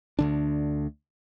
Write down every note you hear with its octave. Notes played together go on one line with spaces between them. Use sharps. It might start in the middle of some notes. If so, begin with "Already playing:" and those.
D2 D3 D4